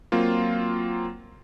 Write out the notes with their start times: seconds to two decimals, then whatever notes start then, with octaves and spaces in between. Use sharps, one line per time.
0.12 F#3 A#3 C4 F4